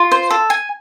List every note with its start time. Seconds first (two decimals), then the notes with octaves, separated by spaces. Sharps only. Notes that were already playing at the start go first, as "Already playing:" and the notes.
Already playing: F4
0.12 C5
0.31 A4
0.50 G#5